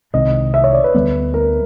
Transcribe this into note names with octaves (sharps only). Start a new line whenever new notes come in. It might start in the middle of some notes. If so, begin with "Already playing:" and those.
C2 C3 D#3 G#3 D#5
E5
C#5
D5
B4
D2 D3 G3 B3
A#4